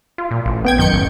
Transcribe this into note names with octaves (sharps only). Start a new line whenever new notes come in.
F4
A#2
A1
B3 G5 G#6
F#2 D#3 G6 C#7
A1